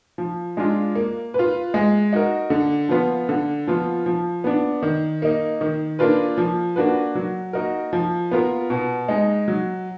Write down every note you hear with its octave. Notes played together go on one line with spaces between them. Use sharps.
F3
G#3 D4 F4
A#3
B4
F4
G#3
D#4 F#4 A#4
D3
F3 B3 F4
D3
F3 B3 F4
F3
B3 D4
D#3
A#3 D#4
D#3
A#3 D4 F4 B4
F3
A#3 D4 F#4 B4
F#3
A#3 D#4 F#4 A#4
F3
B3 F4 A#4
B2
G#3 D#4
F#3